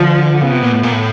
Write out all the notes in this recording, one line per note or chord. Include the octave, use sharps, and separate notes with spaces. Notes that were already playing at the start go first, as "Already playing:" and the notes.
Already playing: D3 F3
C#3 B3
C3
A#2
A2
A#2
A2